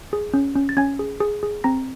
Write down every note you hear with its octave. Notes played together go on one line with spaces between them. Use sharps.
G#4
C#4
C#4
A6
C#4 G#5 G#6
G#4
G#4
G#4
C4 A#5 A#6